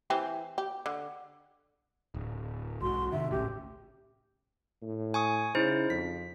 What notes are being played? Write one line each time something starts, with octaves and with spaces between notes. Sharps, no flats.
E3 C4 G4
G4
D3
D1
B1 G#2 F#4 C6
C3 D#3 E5
G#1 C#2 A2 C#4 G4
A2
G#5 C#6 D#6
C#3 D#4 E4 C5
F2 B6